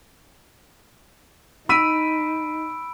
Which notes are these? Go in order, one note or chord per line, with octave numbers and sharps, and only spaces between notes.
D#4 B5 E6 B6 D7 D#7